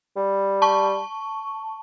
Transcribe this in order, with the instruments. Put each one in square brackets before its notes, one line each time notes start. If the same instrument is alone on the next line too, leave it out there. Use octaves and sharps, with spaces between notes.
[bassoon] G3
[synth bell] A5 C#6